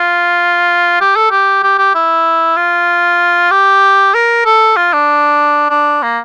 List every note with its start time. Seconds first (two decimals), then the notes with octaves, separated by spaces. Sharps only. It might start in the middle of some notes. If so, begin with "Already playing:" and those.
Already playing: F4
1.01 G4
1.16 A4
1.31 G4
1.63 G4
1.78 G4
1.95 E4
2.57 F4
3.51 G4
4.14 A#4
4.45 A4
4.77 F4
4.93 D4
5.70 D4
6.03 A#3